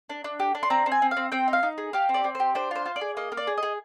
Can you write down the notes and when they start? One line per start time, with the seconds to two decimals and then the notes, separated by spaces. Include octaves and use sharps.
0.10 D4
0.24 D4
0.40 G4
0.55 D4
0.63 C6
0.70 C4 A#5
0.86 C4
0.92 G#5
1.02 C4
1.11 F5
1.17 C4
1.32 C4 G5
1.48 D#4
1.53 F5
1.63 D#4
1.78 G#4
1.93 G4 F5
2.09 C4
2.14 D5
2.24 C4
2.35 G4 C5
2.55 D4 C5
2.71 F4 C5
2.86 F4
2.96 D5
3.01 G#4
3.17 A#3 D#5
3.32 A#3
3.37 D5
3.47 G#4
3.57 D#5
3.63 G#4